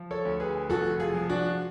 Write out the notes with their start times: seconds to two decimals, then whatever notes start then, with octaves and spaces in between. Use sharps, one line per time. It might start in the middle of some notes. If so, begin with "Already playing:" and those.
Already playing: F3
0.11 A4 C#5
0.25 D2
0.40 G#4 B4
0.69 F1 F#4 A4
1.00 F4 G#4
1.14 F3
1.30 D4 F#4